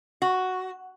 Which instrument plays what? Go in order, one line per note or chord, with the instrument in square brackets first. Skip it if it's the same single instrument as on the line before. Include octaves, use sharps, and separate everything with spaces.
[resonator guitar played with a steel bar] F#4